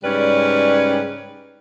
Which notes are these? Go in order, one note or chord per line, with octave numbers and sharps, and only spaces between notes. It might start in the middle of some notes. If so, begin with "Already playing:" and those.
G#2 C#3 G3 C#4 B4 D5